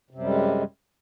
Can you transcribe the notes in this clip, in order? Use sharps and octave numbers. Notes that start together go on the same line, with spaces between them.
F#2 C3 G3 G#3